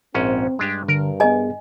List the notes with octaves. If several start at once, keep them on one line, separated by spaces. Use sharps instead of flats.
A#1 G#2 C4 C#4
G2 G#3 D4 G4
D3 A#4
B3 G#4 D#5 G#5